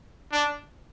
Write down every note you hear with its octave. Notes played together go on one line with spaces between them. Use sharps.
D4